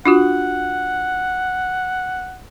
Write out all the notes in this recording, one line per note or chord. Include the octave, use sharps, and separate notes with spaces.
D4 F4 F#4 F#5